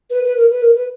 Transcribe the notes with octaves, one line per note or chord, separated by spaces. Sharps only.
B4
B4
A#4
B4
A#4
B4